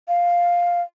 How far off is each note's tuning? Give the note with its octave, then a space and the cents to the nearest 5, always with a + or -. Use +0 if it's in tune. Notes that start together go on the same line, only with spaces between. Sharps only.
F5 +5